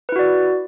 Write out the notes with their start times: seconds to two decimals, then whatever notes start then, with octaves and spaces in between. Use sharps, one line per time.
0.09 B4
0.12 E4
0.16 F#4
0.19 D5